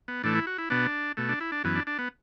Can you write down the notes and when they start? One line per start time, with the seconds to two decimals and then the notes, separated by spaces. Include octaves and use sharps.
0.08 B3
0.23 A2 E3 A3 D4
0.35 E4
0.47 F#4
0.58 E4
0.70 B2 B3 D4
1.17 B2 A3
1.29 D4
1.40 E4
1.52 D4
1.64 F#2 E3 B3
1.75 D4
1.87 D4
1.99 B3